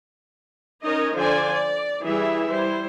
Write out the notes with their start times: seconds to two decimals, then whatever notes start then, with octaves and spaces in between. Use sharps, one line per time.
0.85 C#4 D#4 A#4 C#5 D#5
1.15 D3 F3 C5 D5 G#5
1.53 D5
2.02 E3 G3 E4 G#4 E5
2.47 G3 E4 C5